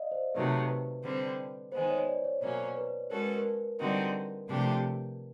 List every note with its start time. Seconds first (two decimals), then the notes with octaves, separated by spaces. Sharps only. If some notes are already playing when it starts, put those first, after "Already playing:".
Already playing: D5 D#5 F5
0.11 C5
0.35 C3 D#3 F#3 A3 B4
0.69 B4
1.04 D3 G3 C4
1.72 D#3 G#3 B3 C5
1.90 C#5
2.07 D5
2.25 C#5
2.41 B2 F#3 A#3 C#4
2.76 B4
3.11 G#3 C#4 F#4 A4 A#4
3.24 B4
3.38 A#4
3.80 D3 G3 C4 D#4 F#4
4.48 C3 F3 A3 D4 G4